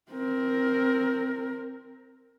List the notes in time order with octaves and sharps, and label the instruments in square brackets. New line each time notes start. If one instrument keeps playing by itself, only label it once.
[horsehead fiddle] C4 A#4